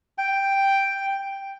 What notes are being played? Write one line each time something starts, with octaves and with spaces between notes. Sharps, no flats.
G5